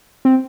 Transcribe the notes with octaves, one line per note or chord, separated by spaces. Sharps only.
C4